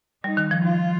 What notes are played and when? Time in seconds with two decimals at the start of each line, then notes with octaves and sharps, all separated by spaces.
0.24 G3 D#4
0.37 D#3
0.51 F3
0.64 F4